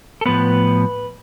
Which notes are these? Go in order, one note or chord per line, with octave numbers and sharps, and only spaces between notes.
A4
A2 F3 B3 B4